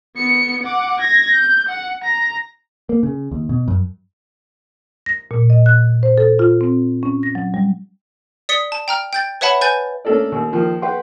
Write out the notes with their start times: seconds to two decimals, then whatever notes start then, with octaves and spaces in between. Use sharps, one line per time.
0.17 B3 C#7
0.63 F#5 D6
1.01 G#6 A#6
1.34 G6
1.69 F#5
2.04 A#5
2.89 A#3
3.03 C#3
3.32 D#2
3.49 B2
3.68 F#2
5.06 A#6
5.31 A#2
5.50 D#5
5.66 F#6
6.03 C5
6.18 A4
6.39 F4
6.61 C4
7.03 C#4
7.23 A#6
7.35 F#3
7.54 G3
8.49 D5 D#6 B6 C#7 G7
8.72 A5
8.88 G5 A#5 F6
9.13 G5 G6 A6
9.41 B4 C#5 E5 F#5 A5 B5
9.61 B4 G#5 G6 A6
10.05 A3 C#4 D4 A4 A#4 D5
10.32 D#2
10.52 D#3 F3 A#3
10.82 B4 F#5 G5 C6